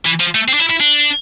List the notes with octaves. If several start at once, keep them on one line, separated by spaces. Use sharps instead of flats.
E3
F3
A3
C4
D4
E4
E4
D4